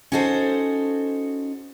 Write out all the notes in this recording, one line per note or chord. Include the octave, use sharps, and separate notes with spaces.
C#4 D#4 F#4 A4 C5